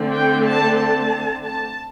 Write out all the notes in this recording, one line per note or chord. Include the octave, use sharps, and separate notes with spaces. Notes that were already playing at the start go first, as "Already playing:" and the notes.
Already playing: D3 A3 C4
G5
A5
A5
A5